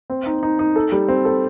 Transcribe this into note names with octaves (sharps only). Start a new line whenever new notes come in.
C4
D#4
D#4
D#4
A4
G3
C4
A4